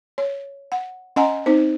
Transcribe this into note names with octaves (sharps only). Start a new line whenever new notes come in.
C#5
F#5
C#4 D#5 F#5 G#5 A#5
C4 D#4 C5